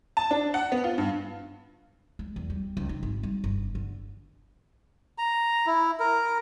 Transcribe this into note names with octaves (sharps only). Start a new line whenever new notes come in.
A5
D4
F#5
B3
F4
G2
G#3
E2
G3
C#2
D#3
G#1
G3
G1
D3
A#5
E4
A#4